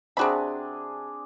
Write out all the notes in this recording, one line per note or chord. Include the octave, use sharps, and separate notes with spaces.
C3 C4 D4 F#4 G#4 B5